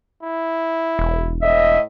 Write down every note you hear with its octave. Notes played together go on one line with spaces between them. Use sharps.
E4
E1
A2 D#5 E5